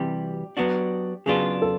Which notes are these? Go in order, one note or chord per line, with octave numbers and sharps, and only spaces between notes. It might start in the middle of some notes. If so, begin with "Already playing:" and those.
Already playing: C3 E3 G3 G4
F#3 B3 D4 F#4
C#3 F#3 B3 D4 F4 G#4
A4